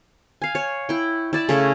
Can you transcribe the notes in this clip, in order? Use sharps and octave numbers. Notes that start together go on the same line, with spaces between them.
F5 G#5
C#5
E4 G5
E4 D5 A5
C#3 A3 E4 C#5